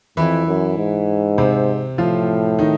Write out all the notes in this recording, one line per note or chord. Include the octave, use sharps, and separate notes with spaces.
F2 E3 E4
F#2
G#2
C3 C4
A2 F3 F4
D#3 D#4